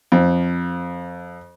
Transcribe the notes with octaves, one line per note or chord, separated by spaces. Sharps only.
F2